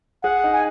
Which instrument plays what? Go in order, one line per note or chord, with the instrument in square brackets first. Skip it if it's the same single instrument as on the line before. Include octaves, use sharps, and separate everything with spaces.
[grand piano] G#4 [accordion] F#5
[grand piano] D#4
[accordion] G#5